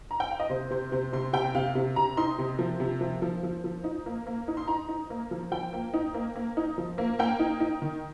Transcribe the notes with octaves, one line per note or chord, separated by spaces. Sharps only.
A#5
G5
F5
D#5
C3 C5
C3 C5
C3 C5
C3 C6
C3 G5
C3 F5
C3
C3 A#5
D#4 C6
C3
F3
C3
F3
F3
F3
F3
D#4
A#3
A#3
D#4
C6
D#4 A#5
D#4
A#3
F3
F3 G5
A#3
D#4
A#3
A#3
D#4
F3
A#3
A#3 G5
D#4
D#4
D#3